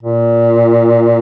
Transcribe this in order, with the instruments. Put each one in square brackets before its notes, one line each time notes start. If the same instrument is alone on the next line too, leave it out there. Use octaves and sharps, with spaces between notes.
[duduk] A#2